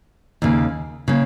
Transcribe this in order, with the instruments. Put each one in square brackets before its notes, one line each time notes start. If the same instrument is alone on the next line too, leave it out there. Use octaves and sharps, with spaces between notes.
[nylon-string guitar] D#2 C#3 A#3
C#3 A#3